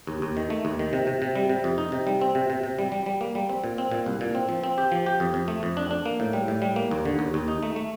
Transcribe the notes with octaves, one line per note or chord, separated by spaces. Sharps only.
D#2
D#2
D#3
A3
D#2
D#3
C3
C3
C3
G3
C3
F2
D#4
C3
G3
C4
C3
C3
C3
G3
G3
G3
A#3
G3
C4
A#2
C4
A#2
C2
A#2
C4
F3
C4
G4
F3
G4
F2
F2
A3
F2
D4
D4
A#3
A2
G3
A2
G3
A#3
D#2
D3
D#2
D#2
D#4
A3
A3